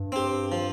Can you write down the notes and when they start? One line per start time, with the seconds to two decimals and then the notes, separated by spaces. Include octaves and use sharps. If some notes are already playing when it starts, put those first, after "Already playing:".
Already playing: G2
0.12 C4 G4
0.52 F3